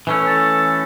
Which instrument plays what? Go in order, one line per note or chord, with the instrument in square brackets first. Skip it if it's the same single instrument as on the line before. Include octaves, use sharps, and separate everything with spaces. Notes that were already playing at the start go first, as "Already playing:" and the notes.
[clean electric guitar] E3 A3 C#4
[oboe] A4